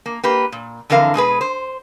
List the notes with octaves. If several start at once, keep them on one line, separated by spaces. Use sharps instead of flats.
A#3
A#3 G4 B4
A#2
F2 D3 E3 A#4 F5
B2 G#3 G#4 B4
C5